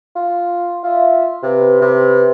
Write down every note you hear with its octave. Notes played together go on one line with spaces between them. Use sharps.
F4
F4 E5
C3 B4
C3